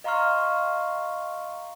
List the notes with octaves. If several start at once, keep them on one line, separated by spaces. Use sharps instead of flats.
D#5 F5 A#5 C6 C#6 F6